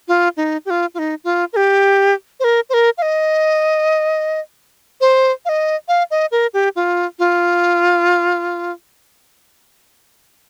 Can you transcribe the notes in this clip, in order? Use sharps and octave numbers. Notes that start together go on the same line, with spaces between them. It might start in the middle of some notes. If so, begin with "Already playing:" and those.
F4
D#4
G4
F4
F4
D#4
F4
A#4
G4
C5
A#4
C5
A#4
F5
D#5
C5
F5
D#5
F5
D#5
A#4
G4
F4
F4